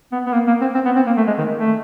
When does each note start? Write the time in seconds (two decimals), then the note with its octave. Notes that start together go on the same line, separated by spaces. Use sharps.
0.12 B3
0.26 B3
0.33 A#3
0.47 A#3
0.61 C4
0.75 C4
0.86 B3
0.96 C4
1.07 A#3
1.17 A3
1.28 G#3
1.38 D#3
1.59 A3